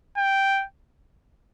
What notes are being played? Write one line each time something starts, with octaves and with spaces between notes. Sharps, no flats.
G5